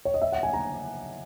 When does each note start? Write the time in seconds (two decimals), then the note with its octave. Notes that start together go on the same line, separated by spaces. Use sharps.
0.05 C#5
0.14 D#5
0.22 E5
0.32 F#5
0.43 G#5
0.53 A#5